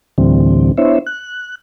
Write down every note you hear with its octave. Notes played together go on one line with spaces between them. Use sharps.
D2 A2 D3 E3 G3 C4
B3 D4 E4 C5 C#5 E5
F#6